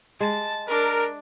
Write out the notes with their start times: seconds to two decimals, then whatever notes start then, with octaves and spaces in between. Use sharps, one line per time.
0.20 G#3 A5
0.69 D4 A#4